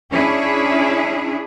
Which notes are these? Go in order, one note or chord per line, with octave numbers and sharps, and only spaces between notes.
C#4 D4 E4 G#4